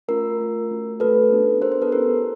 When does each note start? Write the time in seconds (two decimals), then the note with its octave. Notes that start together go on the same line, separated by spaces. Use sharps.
0.08 A3 C#4 F4 A#4
0.40 A3 C#4 F4
0.71 A3 C#4 F#4
1.00 A3 C#4 F#4 A4 B4
1.31 B3 D4 G4
1.61 B3 D4 G4 A#4 C5
1.72 A#4 C5
1.82 A4 B4
1.92 C#4 E4 G4 A#4 C5